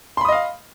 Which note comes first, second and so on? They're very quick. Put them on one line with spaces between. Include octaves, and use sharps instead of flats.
C6 B5 D#6 D#5 F5